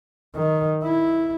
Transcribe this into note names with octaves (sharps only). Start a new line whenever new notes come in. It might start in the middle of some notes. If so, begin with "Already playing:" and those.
D#3
E4